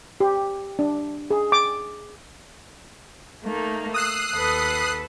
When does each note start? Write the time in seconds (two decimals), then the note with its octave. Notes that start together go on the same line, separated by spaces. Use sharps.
0.20 G4
0.79 D4
1.31 G#4
1.52 D6
3.45 A3 A#3 D#4
3.94 D#6 E6 F#6 C7
4.33 D#2 A4 B4